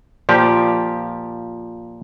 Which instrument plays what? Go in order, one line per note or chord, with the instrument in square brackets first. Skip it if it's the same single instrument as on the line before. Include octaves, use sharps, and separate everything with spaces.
[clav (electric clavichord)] A#2 F3 G4